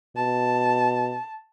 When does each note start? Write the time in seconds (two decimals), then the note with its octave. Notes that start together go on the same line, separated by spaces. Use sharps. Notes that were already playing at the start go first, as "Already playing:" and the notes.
0.16 B2 A5